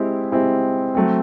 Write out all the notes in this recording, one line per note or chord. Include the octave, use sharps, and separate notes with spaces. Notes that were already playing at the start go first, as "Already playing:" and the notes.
Already playing: G#3 C4 E4 G4
G#3 C4 E4 G4
F#3 A3 C4